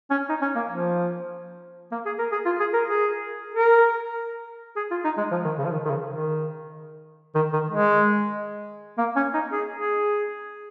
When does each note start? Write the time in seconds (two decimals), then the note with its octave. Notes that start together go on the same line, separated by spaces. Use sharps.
0.11 C#4
0.29 D#4
0.42 C#4
0.56 A#3
0.70 F3
1.92 A#3
2.06 G#4
2.19 A#4
2.32 G#4
2.46 F4
2.60 G#4
2.74 A#4
2.87 G#4
3.55 A#4
4.77 G#4
4.91 F4
5.05 D#4
5.18 G#3
5.32 F3
5.45 D#3
5.58 C#3
5.66 F3
5.72 D#3
5.86 D#3
5.90 C#3
6.08 D#3
7.35 D#3
7.53 D#3
7.71 G#3
8.98 A#3
9.16 C#4
9.34 D#4
9.53 G#4
9.80 G#4